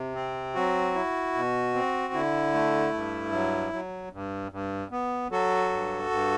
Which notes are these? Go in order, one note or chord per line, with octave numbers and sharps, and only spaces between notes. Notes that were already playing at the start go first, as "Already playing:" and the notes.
Already playing: C3
C4
F#3 F#4
E4
B2
C4
D3 E4
A3
G2
F#3
F#3
G2
G2
B3
F#3 F#4 A4
G2
G2